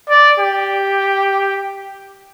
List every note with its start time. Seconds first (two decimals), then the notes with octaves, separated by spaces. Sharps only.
0.10 D5
0.39 G4